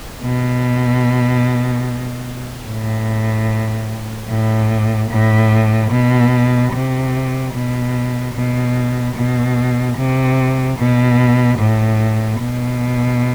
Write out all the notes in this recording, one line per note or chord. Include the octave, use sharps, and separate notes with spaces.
B2
A2
A2
A2
B2
C3
B2
B2
B2
C3
B2
A2
B2